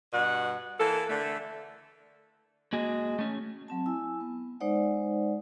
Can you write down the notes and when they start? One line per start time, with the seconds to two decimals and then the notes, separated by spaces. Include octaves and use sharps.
0.13 G2 B2 F#5
0.79 E3 A#3 A4
1.10 D3 A3
2.73 G#3 A#3 F#4 G#4
3.19 A3 C#4
3.68 F#3 C4 A5
3.86 E4 G#5 E6
4.20 B3
4.60 G#3 D#4 C5 D5 F#5